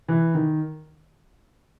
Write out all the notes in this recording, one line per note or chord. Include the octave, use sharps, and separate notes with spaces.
E3
D#3